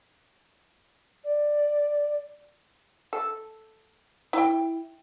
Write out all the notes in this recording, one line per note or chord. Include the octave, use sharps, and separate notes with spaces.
D5
A4
E4 G5